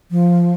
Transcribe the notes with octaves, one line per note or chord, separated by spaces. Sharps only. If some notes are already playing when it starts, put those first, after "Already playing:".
F3